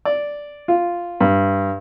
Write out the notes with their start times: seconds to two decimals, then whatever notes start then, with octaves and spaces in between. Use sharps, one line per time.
0.05 D5
0.68 F4
1.20 G2